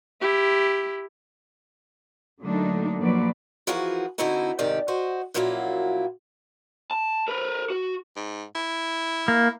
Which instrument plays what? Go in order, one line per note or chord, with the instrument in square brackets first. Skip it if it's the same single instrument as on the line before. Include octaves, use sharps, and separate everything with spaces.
[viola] E4 G4
[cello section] D3 F#3 A3 A#3 D4 D#4
A#2 F3 F#3 A#3 B4 D5
[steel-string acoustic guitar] E3 F3 F#4 G#4 A#4
D3 E3 C4 D#4 E4 F#4
G#2 C3 D#3 G4 D5
F#4 C5 D#5
F#2 A#2 F3 F#3 A#3 E4
[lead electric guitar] A5
A#4 B4
F#4
[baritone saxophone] G#2
E4
[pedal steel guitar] A#3